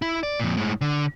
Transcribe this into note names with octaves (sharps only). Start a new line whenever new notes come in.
E4
D5
F2 A#2
A2 G#3
D3